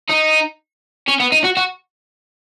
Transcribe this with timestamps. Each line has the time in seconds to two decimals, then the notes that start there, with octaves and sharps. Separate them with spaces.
0.09 D#4
1.08 C#4
1.20 B3
1.32 D#4
1.44 F#4
1.57 F#4